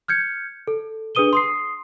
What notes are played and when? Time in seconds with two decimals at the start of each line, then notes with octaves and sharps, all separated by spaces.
0.08 F6 G6 G#6 C#7
0.67 A4
1.15 D4 G#4 B4 D#6 D#7 G7
1.33 C6 D#6 C7